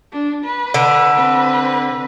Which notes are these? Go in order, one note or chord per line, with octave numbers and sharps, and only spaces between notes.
D4
B4
D3
C4 B4